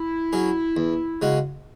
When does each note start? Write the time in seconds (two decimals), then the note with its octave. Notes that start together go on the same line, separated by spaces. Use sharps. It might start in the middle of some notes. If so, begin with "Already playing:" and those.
Already playing: E4
0.33 F#3 C#4 G#4
0.77 E2
1.22 C#3 G#3 C#4 F#4